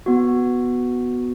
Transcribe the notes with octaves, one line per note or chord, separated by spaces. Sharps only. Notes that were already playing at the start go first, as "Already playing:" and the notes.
B3 F#4